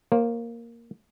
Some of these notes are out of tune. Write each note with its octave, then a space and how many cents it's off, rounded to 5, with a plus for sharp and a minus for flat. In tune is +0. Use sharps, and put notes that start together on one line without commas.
A#3 +0 C5 +45